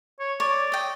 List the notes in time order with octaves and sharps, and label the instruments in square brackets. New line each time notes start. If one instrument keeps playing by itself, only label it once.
[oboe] C#5
[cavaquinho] C#5 [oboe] D5
[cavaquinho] D#5 G5